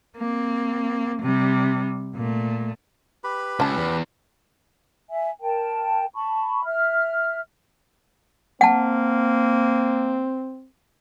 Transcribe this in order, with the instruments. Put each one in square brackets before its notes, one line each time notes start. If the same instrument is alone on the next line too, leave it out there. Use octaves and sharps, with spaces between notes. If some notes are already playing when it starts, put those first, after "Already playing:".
[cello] A#3 C4
C3 G3
A#2 A3
[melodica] G4 B4 B5
[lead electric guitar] C#2 [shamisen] C#4 A5
[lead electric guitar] E2
[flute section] E5 G#5
A#4 G5 A5
A5 B5 C#6
E5 F6
[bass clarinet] A#3 [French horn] C4 [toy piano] F#5 A5